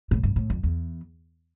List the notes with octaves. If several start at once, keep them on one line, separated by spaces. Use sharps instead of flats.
A2
G2
A2
F2
E2